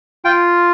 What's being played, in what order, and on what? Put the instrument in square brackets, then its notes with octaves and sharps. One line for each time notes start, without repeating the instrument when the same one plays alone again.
[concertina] F4 G5